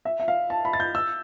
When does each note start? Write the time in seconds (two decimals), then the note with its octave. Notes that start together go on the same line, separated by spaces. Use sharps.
0.05 E5
0.20 E5
0.28 F5
0.50 A5
0.65 B5
0.73 A6
0.80 G6
0.95 E6